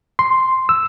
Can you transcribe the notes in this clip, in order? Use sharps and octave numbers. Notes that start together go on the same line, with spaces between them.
C6
E6